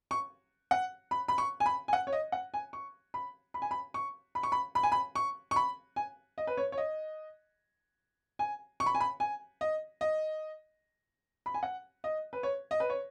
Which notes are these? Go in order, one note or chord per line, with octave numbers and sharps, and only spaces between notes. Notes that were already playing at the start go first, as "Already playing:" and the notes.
C#6
F#5
B5
B5
C#6
G#5
B5
G#5
F#5
C#5
D#5
F#5
G#5
C#6
B5
B5
G#5
B5
C#6
B5
C#6
B5
B5
G#5
B5
C#6
C#6
B5
G#5
D#5
B4
C#5
C#5
D#5
G#5
C#6
B5
G#5
B5
G#5
D#5
D#5
B5
G#5
F#5
D#5
B4
C#5
D#5
B4
C#5